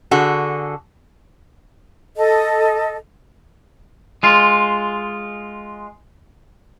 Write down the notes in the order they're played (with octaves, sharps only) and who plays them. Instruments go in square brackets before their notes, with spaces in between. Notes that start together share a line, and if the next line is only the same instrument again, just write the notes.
[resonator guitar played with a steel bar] D3 F#4 G#4 A4
[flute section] A4 D#5
[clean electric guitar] G#3 F4